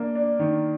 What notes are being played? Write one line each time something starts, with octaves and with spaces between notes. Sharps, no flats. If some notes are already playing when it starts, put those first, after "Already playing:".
Already playing: A#3 D4
D4
D#3